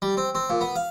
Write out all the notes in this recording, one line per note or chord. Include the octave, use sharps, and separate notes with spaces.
G3
C4
C4
A#2
B3
F5